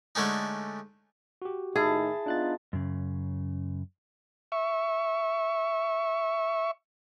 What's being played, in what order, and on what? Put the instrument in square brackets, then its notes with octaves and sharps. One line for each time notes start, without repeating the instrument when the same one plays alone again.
[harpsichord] D3 G#3 A3 C#4 D#4
[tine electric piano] F#4 G4
[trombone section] A2 D#3 D#4 [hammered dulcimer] E4 A5 [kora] G#4
[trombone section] B3 D#4 F4 [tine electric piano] D4 F#6 A6
[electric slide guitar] F#2 C#3
[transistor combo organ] E5 C#6